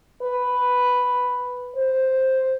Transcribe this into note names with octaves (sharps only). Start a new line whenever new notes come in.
B4
C5